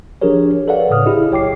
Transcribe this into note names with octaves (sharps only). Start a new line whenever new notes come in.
F3 D4 G4 G#4 A#4 C#5
A4 B4 C#5 D5 F5 F#5
A2 C#3 D#6 F6
E4 G4 G#4 D#5
B1 C#5 G5 D6 C7